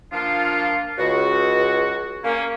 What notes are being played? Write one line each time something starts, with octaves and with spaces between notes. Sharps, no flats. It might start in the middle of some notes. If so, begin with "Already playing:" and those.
F3 A#3 D4 F4
C#2 F#4
A#3 C#4